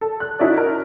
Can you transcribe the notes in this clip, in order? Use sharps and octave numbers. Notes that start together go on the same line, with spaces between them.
A4
F#6
C#4 D#4 E4 F#4 D5
A#4